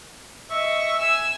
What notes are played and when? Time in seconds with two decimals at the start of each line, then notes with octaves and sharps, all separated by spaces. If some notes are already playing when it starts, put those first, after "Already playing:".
0.51 D#5 E5 C#6
0.98 G#5 E6